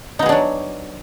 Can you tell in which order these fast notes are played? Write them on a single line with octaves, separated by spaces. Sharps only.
D#4 B3 G#4 D4 F#3